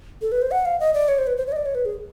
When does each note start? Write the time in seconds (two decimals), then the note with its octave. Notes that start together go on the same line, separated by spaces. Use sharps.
0.22 A4
0.32 B4
0.42 C5
0.51 F#5
0.65 F5
0.80 D#5
0.94 D5
1.08 C#5
1.18 C5
1.27 B4
1.37 C5
1.47 C#5
1.52 D#5
1.56 D5
1.66 C#5
1.75 B4
1.85 G#4